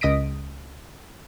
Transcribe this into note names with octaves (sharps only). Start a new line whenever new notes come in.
C#2 D#5 D#6 A#6 B6 D7